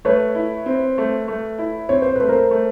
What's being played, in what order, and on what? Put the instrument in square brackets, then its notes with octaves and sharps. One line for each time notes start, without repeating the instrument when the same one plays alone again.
[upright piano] A3 [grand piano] B4 C#5
[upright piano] E4
C4
A3
A3
E4
[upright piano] C4 [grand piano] C#5
[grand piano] C5
[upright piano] A3 [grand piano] B4
[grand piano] A#4 C5
[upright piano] A3